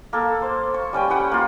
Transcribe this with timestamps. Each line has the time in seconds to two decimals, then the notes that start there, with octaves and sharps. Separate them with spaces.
0.13 A#3 A4
0.42 C5
0.74 C#6
0.93 G3 C#4 B4 G5
1.10 G4 B4 F#5 G5
1.31 A#3 F4